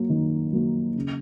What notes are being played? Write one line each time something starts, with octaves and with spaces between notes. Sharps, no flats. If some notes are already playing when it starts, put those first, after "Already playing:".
Already playing: F#3 A#3
D#3
F#3 A#3
C#3